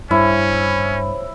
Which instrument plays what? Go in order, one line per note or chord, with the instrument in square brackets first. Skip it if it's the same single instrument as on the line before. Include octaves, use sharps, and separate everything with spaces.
[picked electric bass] G2 [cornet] C#4 [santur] E4 [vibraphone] C5 C#5